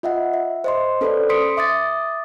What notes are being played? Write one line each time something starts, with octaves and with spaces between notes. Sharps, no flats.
F4 D#5 E5 F#5
E5
C5 D#5 C6
C#4 A4 B4 C5 D5
C6 D#6 B6 C#7 D7
E5 D6 D#6 A6